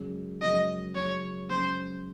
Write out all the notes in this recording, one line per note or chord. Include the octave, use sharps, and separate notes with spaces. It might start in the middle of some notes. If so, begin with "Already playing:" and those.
Already playing: F#2 C#3 G#3 C#4
F#2 C#3 G#3 C#4 D#5
F#2 C#3 G#3 C#4 C#5
F#2 C#3 G#3 C#4 C5